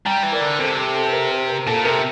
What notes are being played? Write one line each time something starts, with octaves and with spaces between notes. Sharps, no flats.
G3 G5 A#5
E3
A#4 D5
D3
C3 A4 C5
A4
A4
C5
A#4
A#4
A#4
A#2 A4
C3 A#4